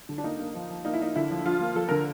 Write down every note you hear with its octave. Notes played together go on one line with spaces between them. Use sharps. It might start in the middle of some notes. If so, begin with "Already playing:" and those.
D3
D4
A#3 D#4
A#3
F3
F3
A#3 D#4
E4
A#3 D#4
D3 E4
F3
F3 F4
A#3
F3 A4
D3 A#4